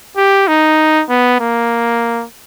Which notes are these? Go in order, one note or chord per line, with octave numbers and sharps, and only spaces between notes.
G4
D#4
B3
A#3